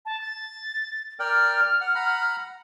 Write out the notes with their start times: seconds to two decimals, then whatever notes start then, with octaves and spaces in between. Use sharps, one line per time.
0.06 A5
0.21 A6
1.20 A#4 D5 G5 F6
1.81 F#5
1.95 F#5 A#5 B5